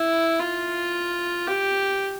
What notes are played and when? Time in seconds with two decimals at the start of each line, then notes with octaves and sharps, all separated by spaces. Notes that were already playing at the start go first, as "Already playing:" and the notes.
Already playing: E4
0.40 F4
1.47 G4